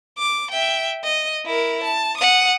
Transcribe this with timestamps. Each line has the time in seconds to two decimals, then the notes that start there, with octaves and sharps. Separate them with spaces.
0.18 D6
0.51 E5 G5
1.04 D#5
1.46 E4 A#4
1.83 A5
2.18 F#5 D#6